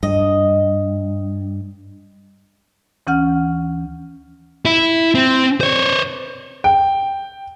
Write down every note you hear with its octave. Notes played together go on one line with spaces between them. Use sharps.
G2 D#5
D2 E3 C#4 F#5 F6
E4
C4
C5 C#5
G5